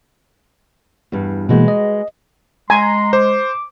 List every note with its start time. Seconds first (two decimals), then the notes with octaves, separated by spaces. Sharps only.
1.12 E2 G2
1.49 B2 E3 G#3 A#3 F#4 B4
1.68 D#5
2.70 G#3 G#5 A#5 C6
3.13 C5 D6